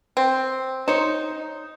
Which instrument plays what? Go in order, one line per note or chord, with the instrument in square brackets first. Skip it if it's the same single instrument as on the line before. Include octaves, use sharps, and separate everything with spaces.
[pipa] C4
[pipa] D#4 [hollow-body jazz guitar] C5 C#5